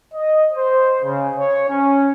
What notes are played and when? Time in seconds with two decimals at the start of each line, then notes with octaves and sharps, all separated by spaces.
0.14 D#5
0.52 C5
1.02 C#3
1.37 C#5
1.69 C#4